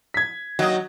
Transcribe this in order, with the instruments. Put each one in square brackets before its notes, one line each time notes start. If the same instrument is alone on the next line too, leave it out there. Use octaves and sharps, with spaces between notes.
[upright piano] G#6 B6
[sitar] D#3 A#3 D#5 [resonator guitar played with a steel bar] F#3